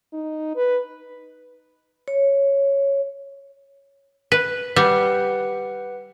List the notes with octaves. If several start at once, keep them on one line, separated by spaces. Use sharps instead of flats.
D#4
B4
C#5
B4
G3 B4 F#5